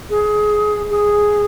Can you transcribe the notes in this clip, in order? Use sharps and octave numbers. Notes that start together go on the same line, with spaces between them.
G#4
G#4